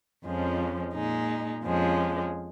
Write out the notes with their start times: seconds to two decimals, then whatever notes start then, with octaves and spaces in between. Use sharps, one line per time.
0.24 F2 F3 G#3 C#4
0.94 A#2 G#3 D#4
1.64 F2 F3 G#3 C#4